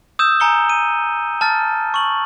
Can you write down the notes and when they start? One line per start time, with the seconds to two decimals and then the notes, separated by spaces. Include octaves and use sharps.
0.19 D#6 E6 G6 E7
0.40 G#5 A#5 C#7 G7
0.69 D#7
1.41 A5 F6 A6
1.94 C#6 F#7